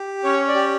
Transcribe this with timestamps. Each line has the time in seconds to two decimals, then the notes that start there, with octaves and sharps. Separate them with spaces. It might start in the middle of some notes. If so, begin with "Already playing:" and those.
Already playing: G4
0.24 C#4 C#5
0.48 D5
0.55 G4